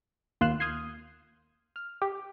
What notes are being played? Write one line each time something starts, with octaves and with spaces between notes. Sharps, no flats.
D#2 F4 C6 F#6 E7
D#6 F6 G6 G#6 C7
F6
G4